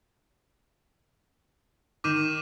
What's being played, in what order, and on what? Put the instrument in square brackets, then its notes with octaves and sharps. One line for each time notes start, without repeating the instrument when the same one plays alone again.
[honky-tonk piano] D#3 [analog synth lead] D#4 [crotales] D6 D#7 E7